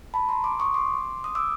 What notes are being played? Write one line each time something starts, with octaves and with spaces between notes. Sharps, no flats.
A5 B5
A#5 C6
C6 D6
C#6 D#6
C6 D6
D#6
D6 E6